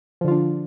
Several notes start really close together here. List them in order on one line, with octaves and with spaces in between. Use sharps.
F3 D3 F4 D4